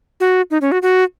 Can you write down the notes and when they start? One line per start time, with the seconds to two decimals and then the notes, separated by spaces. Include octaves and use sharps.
0.20 F#4
0.51 D#4
0.61 C#4
0.72 F#4
0.82 F#4